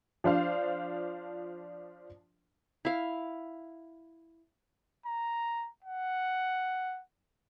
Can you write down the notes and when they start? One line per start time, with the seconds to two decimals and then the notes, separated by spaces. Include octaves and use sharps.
0.24 F3 D4 C5 F5
2.85 E4 F5
5.06 A#5
5.84 F#5